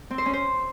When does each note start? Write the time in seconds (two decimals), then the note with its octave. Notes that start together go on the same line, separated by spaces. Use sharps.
0.10 C4
0.18 C5
0.26 C#4
0.33 C5